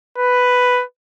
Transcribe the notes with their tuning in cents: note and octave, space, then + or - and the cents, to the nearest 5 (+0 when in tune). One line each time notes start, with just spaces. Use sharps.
B4 +5